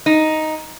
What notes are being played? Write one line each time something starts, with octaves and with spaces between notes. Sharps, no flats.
D#4